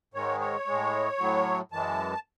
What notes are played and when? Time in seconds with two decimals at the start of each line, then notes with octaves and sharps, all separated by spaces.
0.14 G#2 D#3 G#3 C#5
0.40 C#5
0.67 A2 G#3
1.19 A2 F#3
1.72 F#2 E3 G#3 A5